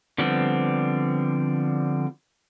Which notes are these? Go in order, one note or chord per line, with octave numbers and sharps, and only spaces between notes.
D3 F3 G3 B3 C4